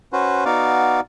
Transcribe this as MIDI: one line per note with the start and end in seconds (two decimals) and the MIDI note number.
0.13 0.44 61
0.13 0.44 66
0.13 0.44 71
0.13 0.44 72
0.45 1.00 59
0.45 1.00 63
0.45 1.00 66
0.45 1.00 74
0.45 1.00 77